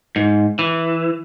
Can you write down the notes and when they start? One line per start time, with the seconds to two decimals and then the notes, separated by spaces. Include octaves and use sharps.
0.16 G#2
0.59 E3